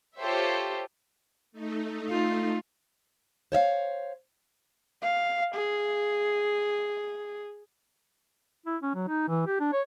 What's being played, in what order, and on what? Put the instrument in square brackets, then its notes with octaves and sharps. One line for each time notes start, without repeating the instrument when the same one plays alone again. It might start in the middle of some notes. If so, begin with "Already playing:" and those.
[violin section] F4 G4 A4 C5 C#5 E5
[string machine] A3 D#4
[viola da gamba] F4
[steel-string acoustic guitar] C5 C#5 E5 F5
[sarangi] F5
G#4
[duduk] E4
C#4
F#3
D#4
E3
G4
D4
C#5